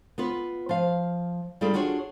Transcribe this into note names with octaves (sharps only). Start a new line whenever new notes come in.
B3 F4 B4
F3 F5
G3 A#3 D4 F4 G#4 A4
D4 F4 F#4 G#4 C#5